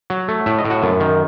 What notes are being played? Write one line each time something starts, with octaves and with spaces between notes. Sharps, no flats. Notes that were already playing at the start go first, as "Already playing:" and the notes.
F#3
A3
A2 E5
D#5
A2
F#4
F#2
D#3